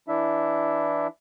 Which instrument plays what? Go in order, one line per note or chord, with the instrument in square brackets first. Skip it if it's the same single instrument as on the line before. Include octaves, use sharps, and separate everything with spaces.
[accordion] E3 D4 E4 E5